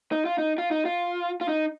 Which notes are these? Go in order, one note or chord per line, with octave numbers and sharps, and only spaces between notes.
D#4
F4
D#4
F4
D#4
F4
F4
D#4